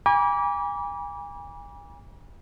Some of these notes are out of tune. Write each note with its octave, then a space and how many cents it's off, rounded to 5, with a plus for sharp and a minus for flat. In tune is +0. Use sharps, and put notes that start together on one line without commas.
G#5 -35 B5 -45 D6 -25